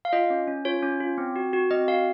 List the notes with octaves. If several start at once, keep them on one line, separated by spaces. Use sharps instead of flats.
F5
F4 D#5
C#4
C#4
F4 C#5
C#4
F4
C4
F#4
F#4
C4 D#5
F#4 F5